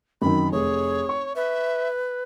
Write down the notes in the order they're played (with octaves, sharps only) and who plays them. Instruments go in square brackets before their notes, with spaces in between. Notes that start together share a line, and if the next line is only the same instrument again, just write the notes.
[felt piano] F#2 D#3 [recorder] C4 [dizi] B5
[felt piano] F1 [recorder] G#4 [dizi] C#5
[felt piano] C#6
[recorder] B4 [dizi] E5